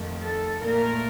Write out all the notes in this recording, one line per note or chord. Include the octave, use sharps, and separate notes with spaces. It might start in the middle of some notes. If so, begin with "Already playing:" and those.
Already playing: F2 D#3 A3
A4
A#2 A3 A#4